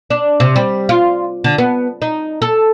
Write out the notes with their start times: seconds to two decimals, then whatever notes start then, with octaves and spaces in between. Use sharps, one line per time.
0.10 D4
0.40 C3
0.56 G3
0.89 F4
1.44 D3
1.58 B3
2.02 D#4
2.42 A4